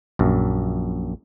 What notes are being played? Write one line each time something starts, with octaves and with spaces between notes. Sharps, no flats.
A#1 F#2